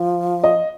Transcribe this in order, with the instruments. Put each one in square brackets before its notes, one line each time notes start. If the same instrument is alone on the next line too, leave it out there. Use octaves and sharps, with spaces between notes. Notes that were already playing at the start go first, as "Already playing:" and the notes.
Already playing: [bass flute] F3
[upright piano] D#5